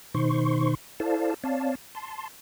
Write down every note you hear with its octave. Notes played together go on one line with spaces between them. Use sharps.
B2 D#3 D#4 C5 C6 C#6
E4 A4 C5 D5 F5 A5
C4 C#5 D5 F5 A5
A5 C6